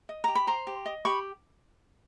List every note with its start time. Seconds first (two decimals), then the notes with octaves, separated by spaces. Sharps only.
0.09 D#5
0.24 G4 A#5
0.35 B5
0.47 C5 A#5 C6
0.67 G4
0.86 D#5
1.05 G4 B5 C#6